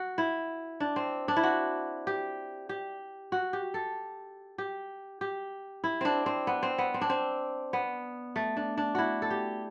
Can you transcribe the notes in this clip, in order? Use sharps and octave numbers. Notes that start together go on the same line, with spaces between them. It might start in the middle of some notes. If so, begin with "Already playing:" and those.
Already playing: F#4
E4
D4
C4
D4
E4
F#4
G4
G4
F#4
G4
A4
G4
G4
E4
C4 D4
C4
B3
C4
B3
C4
D4
C4
B3
A3
D4
D4
E4 F#4
A4
G4